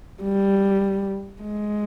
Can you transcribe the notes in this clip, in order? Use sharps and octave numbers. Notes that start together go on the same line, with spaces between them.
G3
G#3